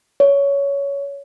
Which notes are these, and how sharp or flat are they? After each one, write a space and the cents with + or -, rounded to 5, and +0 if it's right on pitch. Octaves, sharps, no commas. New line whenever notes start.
C#5 +15